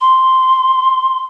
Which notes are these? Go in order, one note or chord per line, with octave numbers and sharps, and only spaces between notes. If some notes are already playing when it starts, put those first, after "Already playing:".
C6